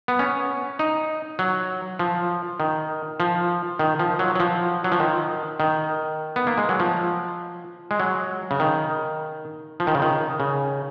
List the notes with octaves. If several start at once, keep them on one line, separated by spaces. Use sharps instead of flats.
B3
C#4
D#4
F#3
F3
D#3
F3
D#3
F3
F#3
F#3
F3
F#3
F3
D#3
D#3
B3
A#3
G#3
F#3
F3
G#3
F#3
C#3
D#3
F3
D#3
C#3
D#3
C#3